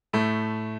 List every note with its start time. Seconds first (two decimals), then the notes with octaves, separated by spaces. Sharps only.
0.13 A2 A3